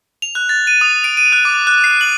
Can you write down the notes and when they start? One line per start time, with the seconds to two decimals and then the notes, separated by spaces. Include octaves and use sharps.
0.22 F7
0.35 F#6
0.49 A6
0.67 D#7
0.81 D#6
1.04 D7
1.17 D#7
1.32 F#6
1.45 D6
1.67 F#6
1.84 C7
2.01 F#7